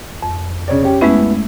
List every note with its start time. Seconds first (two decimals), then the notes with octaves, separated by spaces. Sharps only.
0.22 F2
0.68 C#3 C#5 D5
0.83 C#4 G4
1.01 G#3 A3 B3 C#4 E4